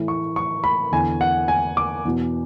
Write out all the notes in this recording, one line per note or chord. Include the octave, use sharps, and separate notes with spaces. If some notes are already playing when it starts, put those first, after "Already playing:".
Already playing: A2 E3
C#6
C#6
B5
E2 D3 G#5
F#5
G#5
D6
E2 B2